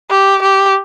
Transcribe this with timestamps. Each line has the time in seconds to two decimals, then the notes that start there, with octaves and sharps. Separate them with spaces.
0.10 G4
0.42 G4